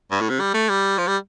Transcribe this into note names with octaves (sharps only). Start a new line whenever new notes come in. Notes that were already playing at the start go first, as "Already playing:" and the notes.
G2
A2
C3
G3
A3
G3
F3
G3